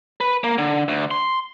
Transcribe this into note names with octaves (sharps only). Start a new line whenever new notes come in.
B4
A#3
D3
D2
C6